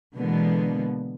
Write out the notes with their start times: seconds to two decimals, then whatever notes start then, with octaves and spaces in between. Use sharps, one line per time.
0.16 B2 D3 E3 G#3 A#3 B3